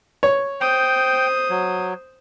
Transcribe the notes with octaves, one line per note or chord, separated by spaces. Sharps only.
C#5
C5 G5 D#6
F#3